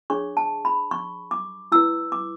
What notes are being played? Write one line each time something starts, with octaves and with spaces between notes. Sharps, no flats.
D4 G#4 C#5 C#6
A5
B5
C#6
D6
E4 B4 E6
D6